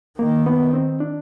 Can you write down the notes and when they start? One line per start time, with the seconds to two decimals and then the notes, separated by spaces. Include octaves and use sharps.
0.19 D#3 A#3
0.46 B3
0.73 C4
1.00 D4